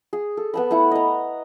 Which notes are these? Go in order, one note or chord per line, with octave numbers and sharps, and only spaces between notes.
G#4
A4
B3 A5 B5
A3 E4 F#5
D#5 A#5